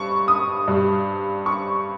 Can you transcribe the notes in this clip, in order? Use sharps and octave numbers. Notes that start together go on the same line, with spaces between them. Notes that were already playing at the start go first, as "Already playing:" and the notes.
Already playing: G2 C#6
D#6
G2 G3
C#6